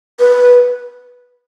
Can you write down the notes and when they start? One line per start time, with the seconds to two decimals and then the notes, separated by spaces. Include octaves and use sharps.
0.20 B4